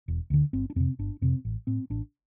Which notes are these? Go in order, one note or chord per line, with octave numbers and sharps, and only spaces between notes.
E1
D2 D3
G1 C4
D4
F2 C3 C4
G1 D4
F2 C3 C4
A1
A2 C4
A1 D4